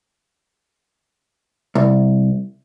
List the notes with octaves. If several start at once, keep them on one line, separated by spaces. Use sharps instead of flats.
C2